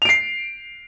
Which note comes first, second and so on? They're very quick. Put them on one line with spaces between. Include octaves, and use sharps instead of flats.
F7 D7 C7